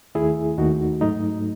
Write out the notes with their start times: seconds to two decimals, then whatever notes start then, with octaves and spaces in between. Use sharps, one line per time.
0.15 D#2 D#3 A3 E4 G#4
0.58 D#2 D#3 A3 D#4 F#4
1.01 G#2 F#3 A3 D#4